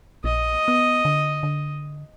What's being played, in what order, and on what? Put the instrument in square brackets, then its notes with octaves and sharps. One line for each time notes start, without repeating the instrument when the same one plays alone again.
[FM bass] A#1 [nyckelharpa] D#5
[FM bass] B3
D3
D3